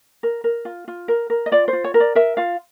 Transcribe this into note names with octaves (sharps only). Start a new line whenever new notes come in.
A#4
A#4
F4
F4
A#4
A#4
D#5
F4 D5
C5
F4
C#5
A#4
D5
A#4 E5
F4 F5